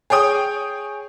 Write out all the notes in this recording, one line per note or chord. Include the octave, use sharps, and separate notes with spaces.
G#4 C#5 G5 D#6